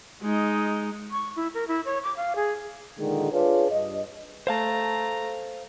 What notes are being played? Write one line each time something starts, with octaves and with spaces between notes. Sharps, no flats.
G#3 D#4
C#6
E4
A#4
E4
C#5
D6
F5
G#4
A#2 D3 D#3 G#3
D4 F4 G#4 B4 C#5
G2 D#5
A3 C5 F5 A5 A#5